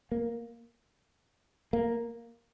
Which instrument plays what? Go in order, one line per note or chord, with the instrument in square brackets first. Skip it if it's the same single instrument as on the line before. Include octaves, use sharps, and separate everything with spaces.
[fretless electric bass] A#3
A#3